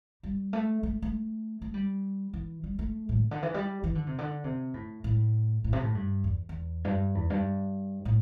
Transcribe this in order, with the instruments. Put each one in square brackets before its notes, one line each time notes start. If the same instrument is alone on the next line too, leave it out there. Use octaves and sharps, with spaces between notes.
[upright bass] G3
A3
A3
A3
A3
G3
E3
G3
A3
A2
C3
D3
E3
G3
E3
D3
C3
D3
C3
A2
A2
A2
C3
A2
G2
E2
E2
G2
E2
G2
A2